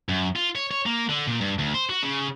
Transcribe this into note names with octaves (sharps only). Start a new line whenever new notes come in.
F#2
F4
C#5
C#5
A#3
D3
A#2
G2
D2
C5
F#4
C#3